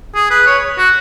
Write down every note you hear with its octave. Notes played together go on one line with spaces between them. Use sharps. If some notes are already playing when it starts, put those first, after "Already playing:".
G#4
B4
C#5
F#4